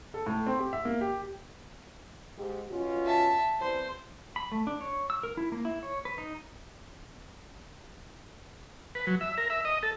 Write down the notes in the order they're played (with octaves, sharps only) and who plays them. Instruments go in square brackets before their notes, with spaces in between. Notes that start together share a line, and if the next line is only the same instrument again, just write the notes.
[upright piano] A4
A2
C4
G4
E5
A#3
G4
[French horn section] G#2 G4
B2 C#4 F4
[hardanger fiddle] E5 A5
[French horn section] E3 G3 C4 [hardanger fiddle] C5
[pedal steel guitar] B5
A3
D4
C#5
E6
A#4
E4
A#3
E4
C#5
B4
D#4
[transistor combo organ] B4
F#3
E5
A#4
E5
D#5
A4